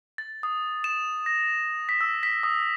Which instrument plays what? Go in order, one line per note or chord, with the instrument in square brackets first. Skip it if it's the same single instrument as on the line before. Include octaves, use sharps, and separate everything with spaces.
[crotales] A6
D#6
E7
A#6
B6
E6
B6
D#6